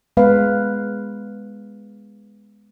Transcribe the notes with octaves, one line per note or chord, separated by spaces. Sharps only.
G#3 B3 B4 F5